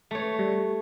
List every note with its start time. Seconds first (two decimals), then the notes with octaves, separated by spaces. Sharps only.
0.11 A3 C#5
0.39 G3